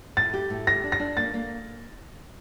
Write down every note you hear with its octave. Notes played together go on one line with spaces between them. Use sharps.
A2 A6
G4
A2
G4 A#6
D4
A#6
D4
A#3 A6
A#3